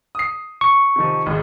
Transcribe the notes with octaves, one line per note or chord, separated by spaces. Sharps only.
D#6 C7
C#6
C3 D#3 F3
G#1 G#2